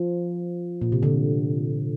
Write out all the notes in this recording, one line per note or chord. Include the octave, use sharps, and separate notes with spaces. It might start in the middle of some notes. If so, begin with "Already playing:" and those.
Already playing: F3
A#2
C3
D3